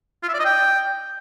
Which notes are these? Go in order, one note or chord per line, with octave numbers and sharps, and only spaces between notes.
F4
E5
D5
D#5
G5